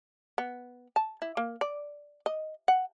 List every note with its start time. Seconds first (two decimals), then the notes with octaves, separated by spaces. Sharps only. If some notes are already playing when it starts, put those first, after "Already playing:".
0.38 B3
0.96 A5
1.22 E4
1.37 A#3
1.61 D5
2.26 D#5
2.68 F#5